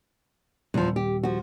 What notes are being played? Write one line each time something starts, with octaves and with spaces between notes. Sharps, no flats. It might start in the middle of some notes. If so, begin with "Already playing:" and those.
D#1 E2 F3
G4
F3 F#4